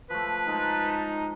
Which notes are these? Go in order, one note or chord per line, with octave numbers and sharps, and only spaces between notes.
F3 A3 B4
G#3 D#4 A#4 A5